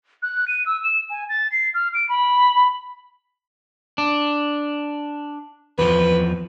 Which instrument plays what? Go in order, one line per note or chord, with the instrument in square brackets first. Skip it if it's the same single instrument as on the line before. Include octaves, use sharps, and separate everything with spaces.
[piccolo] F#6
D#7
E6
E7
G#5
A6
C7
F6
D7
B5
B5
[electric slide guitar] D4
[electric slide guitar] E2 F3 [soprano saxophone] B4